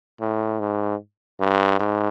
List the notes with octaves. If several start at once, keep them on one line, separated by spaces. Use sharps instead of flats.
A2
G#2
G2
G#2